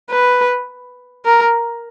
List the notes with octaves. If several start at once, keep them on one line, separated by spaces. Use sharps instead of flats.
B4
A#4